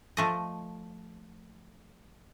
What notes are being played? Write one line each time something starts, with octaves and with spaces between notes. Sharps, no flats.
F3 A3 D#5